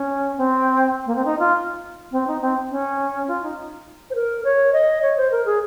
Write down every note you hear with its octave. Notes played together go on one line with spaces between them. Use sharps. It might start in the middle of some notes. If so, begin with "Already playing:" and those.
Already playing: C#4
C4
A#3
C4
D#4
F4
C4
D#4
C4
C#4
F4
D#4
C5
A#4
C#5
D#5
C#5
C5
A#4
G#4